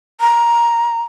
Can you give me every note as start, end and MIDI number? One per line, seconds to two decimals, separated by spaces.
0.21 1.02 82